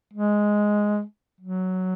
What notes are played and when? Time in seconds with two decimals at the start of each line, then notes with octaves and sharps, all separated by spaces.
0.14 G#3
1.41 F#3